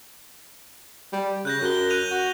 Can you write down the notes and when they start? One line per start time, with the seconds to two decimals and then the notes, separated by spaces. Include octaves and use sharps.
1.13 G3
1.45 C#3 F#6 G6 A#6
1.61 F#2 F#6 G6 G7
1.90 F#6 D#7 F7
2.11 F#4